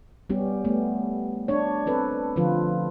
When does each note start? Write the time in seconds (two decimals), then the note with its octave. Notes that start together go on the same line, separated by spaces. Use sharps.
0.30 G3 B3 C#4 G4
0.65 A3 B3
1.48 D4 C#5
1.86 C4 A4 B4
2.36 D3 F3 F4 B4